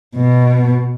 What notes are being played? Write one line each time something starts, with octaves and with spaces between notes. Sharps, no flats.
B2